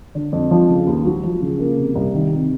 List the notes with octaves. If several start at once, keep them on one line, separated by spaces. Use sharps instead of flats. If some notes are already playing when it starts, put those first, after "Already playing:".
D3
F2
F3
C#3
D#2
F#3
F3
C#3
A#3
C3
C2
D#3
C3